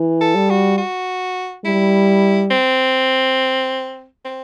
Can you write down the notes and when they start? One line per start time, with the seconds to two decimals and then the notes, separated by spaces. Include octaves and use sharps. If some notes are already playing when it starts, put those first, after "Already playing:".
Already playing: E3
0.21 A4
0.35 G3
0.50 F#4
0.78 F#4
1.65 G3 E4
2.51 C4
4.25 C4